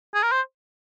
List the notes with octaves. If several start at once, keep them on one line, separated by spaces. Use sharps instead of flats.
G#4
A#4
C5